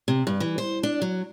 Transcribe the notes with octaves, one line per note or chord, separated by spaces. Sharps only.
C3
G2
E3
C5
D4
F#3